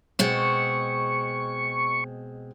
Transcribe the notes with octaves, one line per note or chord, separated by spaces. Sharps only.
B2 G#3 C4 C#6